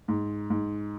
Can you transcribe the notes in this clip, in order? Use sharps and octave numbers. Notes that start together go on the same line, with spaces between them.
G#2
G#2